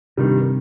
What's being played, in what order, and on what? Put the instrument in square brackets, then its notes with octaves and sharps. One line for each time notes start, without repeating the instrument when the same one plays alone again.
[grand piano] G2 D#3 G3 [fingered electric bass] C3